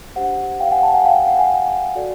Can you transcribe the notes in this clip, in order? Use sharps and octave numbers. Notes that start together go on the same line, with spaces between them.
D4 G4 C5 F#5
F5 G5
F#5 G#5
G5 A5
F#5 G#5
F5 G5
F5
F#5
F#5 G#5
F#4 A4 D5